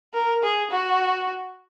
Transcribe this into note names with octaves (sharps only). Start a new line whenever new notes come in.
A#4
G#4
F#4